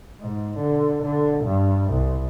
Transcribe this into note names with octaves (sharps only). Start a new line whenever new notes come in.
G#2
D3
D3
G2
C2